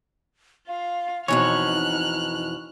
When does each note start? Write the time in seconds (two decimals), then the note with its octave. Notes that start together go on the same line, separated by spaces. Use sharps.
0.68 F4 F5
1.28 F2 B2 E3 D#4 C#5 F6 F#6